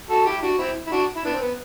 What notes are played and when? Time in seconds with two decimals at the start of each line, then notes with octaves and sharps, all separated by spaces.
0.10 F#4 A4
0.26 E4 G4
0.42 D4 F#4
0.58 C4 E4
0.87 E4
0.92 D4 F#4
1.16 E4
1.24 B3 D4
1.34 C4
1.41 B3